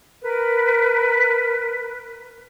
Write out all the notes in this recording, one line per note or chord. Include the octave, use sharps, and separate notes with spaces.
A#4 B4